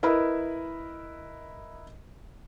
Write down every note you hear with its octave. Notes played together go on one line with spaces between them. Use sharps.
E4 A#4 B4 D#5 E5 B5